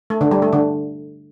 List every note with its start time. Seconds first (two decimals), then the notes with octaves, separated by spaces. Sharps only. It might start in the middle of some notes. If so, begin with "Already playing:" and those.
0.10 A3
0.21 D3
0.31 G3
0.42 A3
0.53 D3